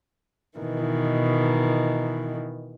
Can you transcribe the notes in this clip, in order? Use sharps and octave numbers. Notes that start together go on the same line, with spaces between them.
B2 D#3 E3